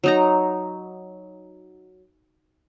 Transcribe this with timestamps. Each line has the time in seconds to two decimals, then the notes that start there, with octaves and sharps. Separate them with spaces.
0.04 F#3 D#4 A#5